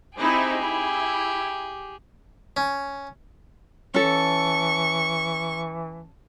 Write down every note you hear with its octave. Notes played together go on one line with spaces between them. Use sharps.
C4 D#4 E4 G4 G#4
E4
C#4
E3 C#4 A4 C#6